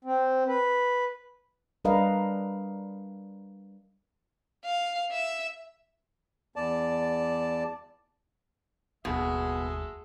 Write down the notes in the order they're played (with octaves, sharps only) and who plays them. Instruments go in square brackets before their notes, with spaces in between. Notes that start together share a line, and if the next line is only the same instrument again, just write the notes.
[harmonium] C4
B4
[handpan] G3 D4 A#4 B4 D#5 F5
[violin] F5
E5
[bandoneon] E2 D5 A5
[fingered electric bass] F#1 D#2 A#3 [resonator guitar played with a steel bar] B2 [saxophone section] G#3 A4 E5 [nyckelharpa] G#4